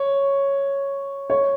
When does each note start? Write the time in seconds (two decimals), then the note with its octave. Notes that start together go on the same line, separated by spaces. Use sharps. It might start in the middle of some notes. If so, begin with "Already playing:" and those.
Already playing: C#5
1.30 C#5